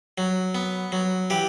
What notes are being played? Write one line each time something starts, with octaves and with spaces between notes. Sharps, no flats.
F#3
B3
F#3
E3 G4